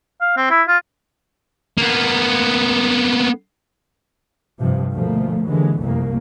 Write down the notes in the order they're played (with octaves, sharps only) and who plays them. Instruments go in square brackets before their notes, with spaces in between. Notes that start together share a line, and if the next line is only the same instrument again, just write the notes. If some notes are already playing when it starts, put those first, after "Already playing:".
[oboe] F5
C4
E4
F4
[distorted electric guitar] A#3 B3
[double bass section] G2 C3 F3
D2 B2 F3 A3 A#3
D#2 D3 E3 G#3
F#1 C2 F2 A3 A#3